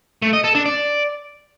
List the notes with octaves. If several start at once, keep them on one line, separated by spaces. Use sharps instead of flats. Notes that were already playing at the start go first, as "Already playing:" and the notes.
A3
D#5
A4
D4
D5